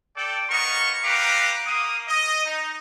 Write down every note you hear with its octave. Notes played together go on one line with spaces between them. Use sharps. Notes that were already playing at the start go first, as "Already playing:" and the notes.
A4 D5 G5
A#3 B3 D#4 A#4 D#5 C#6
F#4 G4 B4 F5 A#5 D6
A#3 D#6
D#5
D#4